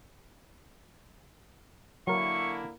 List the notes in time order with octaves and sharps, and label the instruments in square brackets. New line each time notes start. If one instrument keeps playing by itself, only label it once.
[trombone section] D3 A#3 E4 [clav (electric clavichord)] F#3 A#4 [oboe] C#6